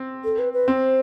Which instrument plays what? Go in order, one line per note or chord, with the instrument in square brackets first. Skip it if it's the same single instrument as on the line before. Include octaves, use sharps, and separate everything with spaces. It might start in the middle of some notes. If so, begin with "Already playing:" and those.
Already playing: [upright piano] C4
[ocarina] A4
B4
B4
[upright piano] C4 [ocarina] C5